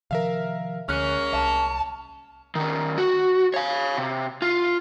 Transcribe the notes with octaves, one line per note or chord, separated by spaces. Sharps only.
C3 D#3 F3 A#4 E5 F5
D2 G#3 A#3 C#4 F6 F#6
C2 A5
D#3 C#4
F#4
C#5 F5
C3
F4